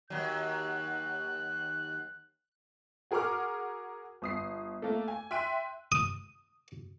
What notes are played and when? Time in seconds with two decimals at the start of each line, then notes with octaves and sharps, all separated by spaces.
0.10 D#2 F#3 F#6
3.11 F#4 G#4 A#4 F#5 D6 F6
4.22 G1 D#6 C7
4.82 A3 A#3
5.08 G#5
5.31 E5 G5 C6 F#6 D#7
5.92 D#6